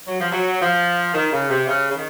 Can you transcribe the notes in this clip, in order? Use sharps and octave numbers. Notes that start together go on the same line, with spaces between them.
F#3
F3
F#3
F3
D#3
C#3
C3
C#3
C#3
D#3